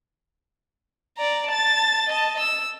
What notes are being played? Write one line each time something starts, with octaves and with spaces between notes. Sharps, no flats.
D5 A#5
A5 A6
D#5 A5
E6